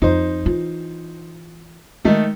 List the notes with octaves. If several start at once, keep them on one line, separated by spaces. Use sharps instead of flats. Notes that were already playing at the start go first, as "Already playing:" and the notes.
F2 D#4 C5
E3 F4
D#3 G#3 A3 D#4